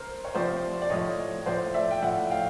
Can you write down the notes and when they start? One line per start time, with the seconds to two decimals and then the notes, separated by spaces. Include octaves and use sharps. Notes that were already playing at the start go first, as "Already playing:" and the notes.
Already playing: A#4 C5
0.25 C#5
0.35 C3 F3 C5 D5
0.82 D5
0.90 A2 F3 C#5 D#5
1.46 A2 F3 C5 D5
1.74 D5 E5
1.91 G5
2.02 A2 F3 E5 F#5
2.30 F5 G5